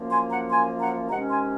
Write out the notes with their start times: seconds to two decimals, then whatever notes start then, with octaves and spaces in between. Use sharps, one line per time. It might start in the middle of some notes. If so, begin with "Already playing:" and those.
Already playing: F#2 F3 A#3
0.10 G#5 C6
0.30 F#5 A#5
0.50 G#5 C6
0.80 F#5 A#5
1.09 C3 D#3 G#3 C#4 F#5 A#5
1.30 G#5 C6